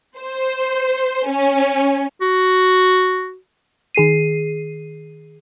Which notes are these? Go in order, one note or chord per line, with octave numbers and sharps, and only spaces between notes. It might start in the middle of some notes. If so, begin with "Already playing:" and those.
C5
C#4
F#4
D#3 G#4 C7 D#7